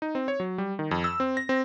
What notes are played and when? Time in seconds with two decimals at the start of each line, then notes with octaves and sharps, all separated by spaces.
0.02 D#4
0.15 C4
0.28 C#5
0.40 F#3
0.58 G3
0.79 D#3
0.91 F2
1.04 E6
1.20 C4
1.37 A#6
1.49 C4